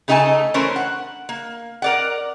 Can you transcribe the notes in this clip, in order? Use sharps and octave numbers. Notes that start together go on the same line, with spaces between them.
C#3 A3 D#4 A4 G#5 A5
E3 A3 C#4 A#4 C5
F#5
A#3
A#4 D5 F#5